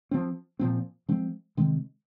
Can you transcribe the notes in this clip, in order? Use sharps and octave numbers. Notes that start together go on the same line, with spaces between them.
F3 C4
A#2 F3 C4
F3 G#3 C4
C3 D#3 G#3 C4